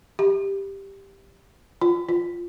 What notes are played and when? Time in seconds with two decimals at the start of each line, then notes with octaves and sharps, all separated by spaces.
0.19 G4
1.82 F4
2.09 F4